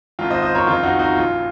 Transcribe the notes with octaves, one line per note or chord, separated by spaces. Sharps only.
G#1 G#2 D#3 F4
C5 D#5
C5 D#5
A#4 C#5
F#1 F2 D#3 F4
D#4 F#4
D#4 F#4
A#1 A#2 F4